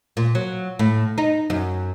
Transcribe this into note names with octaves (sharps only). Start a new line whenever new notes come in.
A#2
F#3
A2
D#4
F#2